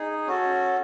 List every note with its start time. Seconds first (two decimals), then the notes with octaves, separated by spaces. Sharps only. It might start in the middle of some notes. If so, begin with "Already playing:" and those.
Already playing: D#4 G#4
0.27 C#4 F#4 A4